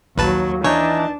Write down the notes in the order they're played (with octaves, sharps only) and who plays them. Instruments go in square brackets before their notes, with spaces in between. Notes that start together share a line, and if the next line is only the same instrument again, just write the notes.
[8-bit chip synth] A#1 B4 A5 [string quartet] D#2 F#3
[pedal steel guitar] E3 D#4 [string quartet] D4 A5 [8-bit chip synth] C#5